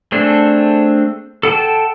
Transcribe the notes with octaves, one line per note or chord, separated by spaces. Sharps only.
A3 C4 D4 G#4 A4
A4 F#5 G5 A5